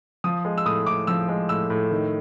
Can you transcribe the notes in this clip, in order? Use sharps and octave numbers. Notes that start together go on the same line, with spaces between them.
F3 D#6
G#3
E6
A2 D#6
A2 D6
F3 E6
G#3
A2 E6
A2
D#3